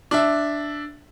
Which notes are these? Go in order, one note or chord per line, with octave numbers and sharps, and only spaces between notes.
D4 E5